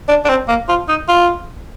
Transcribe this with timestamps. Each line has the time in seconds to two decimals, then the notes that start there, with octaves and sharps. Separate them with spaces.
0.08 D4
0.25 D4
0.29 C4
0.48 A#3
0.69 F4
0.89 D#4
1.09 F4